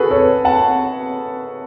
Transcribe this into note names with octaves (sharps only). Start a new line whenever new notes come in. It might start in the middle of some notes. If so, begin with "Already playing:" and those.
Already playing: F#4 G#4 A4 B4
A4 C#5
F#5 A5